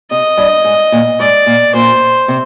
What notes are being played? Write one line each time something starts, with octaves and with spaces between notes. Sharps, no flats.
C3 D#5
G2
G#2
A#2
G#2 D5
A#2
A#2 C5
C3